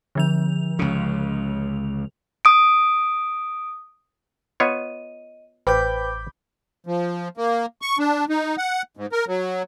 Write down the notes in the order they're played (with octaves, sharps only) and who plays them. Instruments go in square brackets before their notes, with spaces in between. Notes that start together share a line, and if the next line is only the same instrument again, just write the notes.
[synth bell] D3 F3 F7
[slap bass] C#2 C#3
[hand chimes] D#6 D7
[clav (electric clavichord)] B3 F4 C#5 [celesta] D#5 D#7
[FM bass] A1 [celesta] B4 C5 G5 [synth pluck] B5 D6 G6
[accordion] F3
A#3
C#6
D4
D#4
F#5
G#2
A#4
F#3